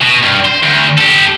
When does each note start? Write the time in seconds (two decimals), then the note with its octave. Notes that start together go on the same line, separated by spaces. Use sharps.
0.01 B2
0.22 G2
0.45 C5
0.63 D2
0.98 G4 A4